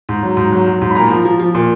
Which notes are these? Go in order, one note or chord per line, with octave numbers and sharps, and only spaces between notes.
G#2
F#3
G#2
F#3
F#3
G#2
B5
A#2 A#5
F3
F3
F3
A#2